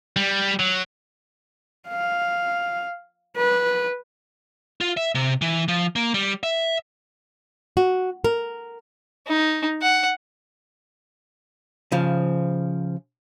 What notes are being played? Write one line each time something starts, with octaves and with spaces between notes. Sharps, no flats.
G3
F#3
F5
B4
F4
E5
C3
E3
F3
A#3
G3
E5
F#4
A#4
D#4
F#5
C#3 F3